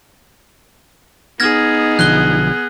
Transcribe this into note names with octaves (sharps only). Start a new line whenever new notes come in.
B3 D#4 G#4 F6 G#6 A#6
B1 D3 F3 F#6 G7